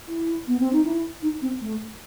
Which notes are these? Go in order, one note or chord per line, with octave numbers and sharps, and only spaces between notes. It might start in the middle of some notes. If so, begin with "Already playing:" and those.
E4
B3
C4
D#4
E4
D#4
C4
A3